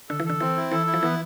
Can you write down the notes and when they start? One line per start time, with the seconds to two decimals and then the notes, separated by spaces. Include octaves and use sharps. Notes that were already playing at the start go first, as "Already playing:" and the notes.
0.09 D3 A4
0.20 E3
0.26 D3 A4
0.40 E3 C4
0.56 E4
0.72 E3 A4
0.87 E4
0.94 F3
1.03 E3 B3